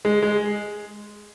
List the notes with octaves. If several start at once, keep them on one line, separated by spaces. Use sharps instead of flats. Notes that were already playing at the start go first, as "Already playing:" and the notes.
G#3
G#3